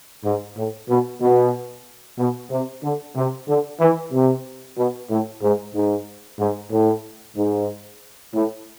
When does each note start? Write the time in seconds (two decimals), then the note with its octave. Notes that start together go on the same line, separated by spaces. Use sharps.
0.24 G#2
0.57 A2
0.89 B2
1.22 B2
2.19 B2
2.51 C3
2.84 D3
3.16 C3
3.49 D3
3.80 E3
4.13 C3
4.78 B2
5.11 A2
5.42 G#2
5.75 G#2
6.39 G#2
6.72 A2
7.37 G#2
8.35 A2